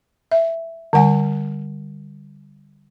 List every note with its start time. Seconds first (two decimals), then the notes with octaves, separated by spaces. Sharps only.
0.31 E5
0.93 D3 G3 F#5 G#5